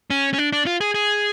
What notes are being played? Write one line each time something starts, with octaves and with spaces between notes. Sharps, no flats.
C#4
C#4
D4
D4
F4
G#4
G#4